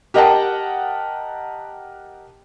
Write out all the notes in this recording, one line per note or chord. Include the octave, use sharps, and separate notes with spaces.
G4 A#4 D#5 F#5 G5 A5